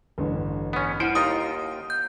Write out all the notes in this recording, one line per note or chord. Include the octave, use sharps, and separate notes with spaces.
A1 G2 D3
B3 C#4
E4 C5 F#5 D7 D#7
D#2 D#4 F4 D#6
G6